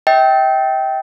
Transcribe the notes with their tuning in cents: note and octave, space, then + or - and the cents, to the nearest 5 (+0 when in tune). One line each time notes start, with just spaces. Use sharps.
E5 -45 G5 -15